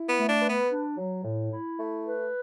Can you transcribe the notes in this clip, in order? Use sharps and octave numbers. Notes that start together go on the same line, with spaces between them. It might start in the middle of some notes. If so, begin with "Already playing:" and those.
Already playing: E4
B3
A3
D4
B4
B3
D4
F#3
A2
E4
A3
B4